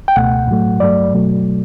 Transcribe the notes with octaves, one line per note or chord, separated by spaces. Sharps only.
G5
C#2 B2 A3 F#5
A2 F#3 A3
G2 F#3 A3 D5
B2 F#3 A3